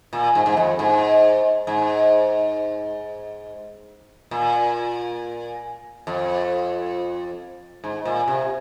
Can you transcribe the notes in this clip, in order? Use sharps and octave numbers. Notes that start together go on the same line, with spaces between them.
A#2
G#2
G#2
F2
G#2
G#2
A#2
F2
G#2
A#2
C3